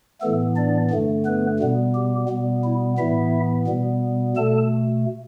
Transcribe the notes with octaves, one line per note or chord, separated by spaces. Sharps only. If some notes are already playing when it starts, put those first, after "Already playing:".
A2 E3 A3 B3 A4
D4 D5
G2 D3 A3
B3 B4
B2 G3 B3
G4
B2 G3 B3
E4
A2 E3 B3 E4 E5
B2 G3 B3
B2 A3 A4 A5